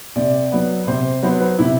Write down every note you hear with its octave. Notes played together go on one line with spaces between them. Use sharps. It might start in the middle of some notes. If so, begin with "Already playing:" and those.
C3 D5
F#3 B3
C3 C5
F#3 B3 C5
B4
C3 E4